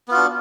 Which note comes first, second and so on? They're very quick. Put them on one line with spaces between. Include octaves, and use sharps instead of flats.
B3 F4 F#4 D4